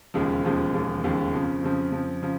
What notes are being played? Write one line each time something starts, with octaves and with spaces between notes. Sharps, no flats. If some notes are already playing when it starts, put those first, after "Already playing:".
E1 D#2 C#3 F3 G#3
E1 D#2 C#3 F3 G#3
E1 D#2 C#3 F3 G#3
E1 D#2 C#3 F3 G#3
F2 C#3 F3
F2 C#3 F3
F2 C#3 F3
C#3 F3